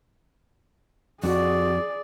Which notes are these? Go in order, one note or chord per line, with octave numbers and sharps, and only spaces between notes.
F2 F#4 G#4 D5